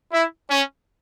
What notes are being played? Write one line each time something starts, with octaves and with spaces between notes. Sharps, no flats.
E4
C#4